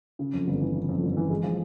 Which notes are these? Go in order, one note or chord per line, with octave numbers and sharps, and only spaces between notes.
C#3
F2
G1
E3
C#3
F2
G1
E3
G#3
F3